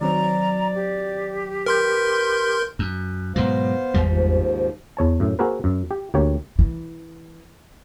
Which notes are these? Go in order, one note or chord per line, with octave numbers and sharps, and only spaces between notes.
D#3 F#3 C4 D5 A#5
G4
A#4 B4 C6 G6
F#2
G#2 B2 F#3 B3 C5 F5
G#1 E2 G3
D#2 G#2 F3
E2 C#5 A5
F#2 A2
A#3 C4 F#4 G#4 A#4 B4
F#2
G4
D2 A#3 G4 C#5
E3